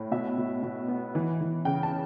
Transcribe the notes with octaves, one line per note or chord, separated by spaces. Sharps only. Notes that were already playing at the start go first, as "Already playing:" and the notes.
Already playing: A2
B2 E5
B2
B2
B3
E3
E3
C#3 G5
A5